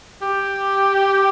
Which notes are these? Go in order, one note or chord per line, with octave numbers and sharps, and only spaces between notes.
G4